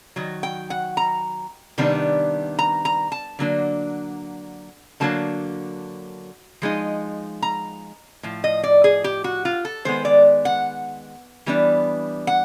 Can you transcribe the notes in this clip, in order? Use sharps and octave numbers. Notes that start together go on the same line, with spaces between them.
D#3 F#3
G5
F#5
A#5
C3 D#3 G3 B3 D4
A#5
A#5
A5
D3 F#3 A#3 D4
D3 F#3 A#3 D4 A5
F3 G#3 D#4
A#5
A2 F3
D#5
D5
G#4
G4
F#4
F4
A4
D#3 G#3 B3 C5
D5
F#5
E3 G3 B3 D4
F#5